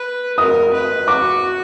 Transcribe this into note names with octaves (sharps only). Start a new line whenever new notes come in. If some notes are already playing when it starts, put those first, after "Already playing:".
Already playing: B4
A#4 D#6
B4
F#4 D6